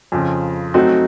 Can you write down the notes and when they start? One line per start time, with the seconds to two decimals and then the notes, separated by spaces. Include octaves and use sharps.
0.12 F2 C#3 F3
0.74 F#3 A3 C4 D#4 F#4